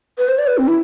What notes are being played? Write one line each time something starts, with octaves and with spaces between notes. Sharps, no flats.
B4
C5
D5
B4
C4
E4